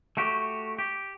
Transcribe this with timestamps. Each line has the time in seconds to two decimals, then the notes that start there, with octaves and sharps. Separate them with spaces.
0.17 A3 F#4 G4
0.78 G4